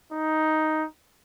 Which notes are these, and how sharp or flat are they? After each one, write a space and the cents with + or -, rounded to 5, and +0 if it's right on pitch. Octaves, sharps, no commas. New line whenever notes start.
D#4 +5